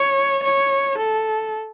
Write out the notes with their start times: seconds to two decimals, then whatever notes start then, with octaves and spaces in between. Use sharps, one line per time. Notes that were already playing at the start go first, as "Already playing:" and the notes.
Already playing: C#5
0.43 C#5
0.98 A4